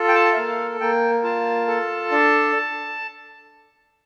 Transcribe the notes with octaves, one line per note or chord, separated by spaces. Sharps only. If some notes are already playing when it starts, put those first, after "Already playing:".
Already playing: F4 A4
G5
A5
E5
A#3 F5
A#3 G5
F4 A5
A4
D4